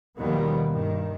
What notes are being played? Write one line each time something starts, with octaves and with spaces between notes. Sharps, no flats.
D#2 B2 D#3 F3 G3 B3
G2 D#3